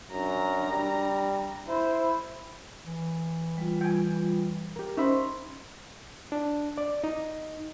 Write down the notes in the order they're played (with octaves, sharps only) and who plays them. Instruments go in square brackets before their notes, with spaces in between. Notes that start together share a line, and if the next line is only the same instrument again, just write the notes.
[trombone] F#2 [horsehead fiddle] D4 A#5
[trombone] G3
[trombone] E4 [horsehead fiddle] C5
[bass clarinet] E3
[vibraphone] G3 F4
[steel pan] G5 G#5
G4 A#4
[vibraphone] C#4 C5 C6 [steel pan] D#4 E5 B5
[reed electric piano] D4
D5
D#4